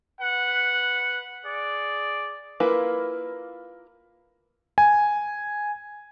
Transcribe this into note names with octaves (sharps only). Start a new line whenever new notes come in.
B4 F#5
G#4 D5
A#3 E4 F4 B4
G#5